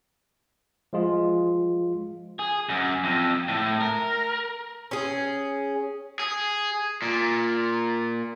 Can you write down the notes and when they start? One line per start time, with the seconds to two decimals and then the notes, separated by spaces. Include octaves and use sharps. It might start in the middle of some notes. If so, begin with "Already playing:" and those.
0.93 F3 G#3 F4
2.39 G#4
2.69 F#2
3.04 F2
3.48 A2
3.81 A#4
4.91 C#4 G#4
6.20 G#4
7.02 A#2